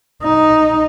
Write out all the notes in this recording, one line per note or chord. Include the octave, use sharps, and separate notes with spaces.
D#4